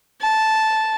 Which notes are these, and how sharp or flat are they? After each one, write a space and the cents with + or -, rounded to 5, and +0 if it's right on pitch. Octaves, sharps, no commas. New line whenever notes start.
A5 -5